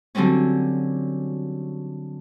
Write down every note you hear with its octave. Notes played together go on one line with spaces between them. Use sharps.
D3 F#3 G3 C4 C#4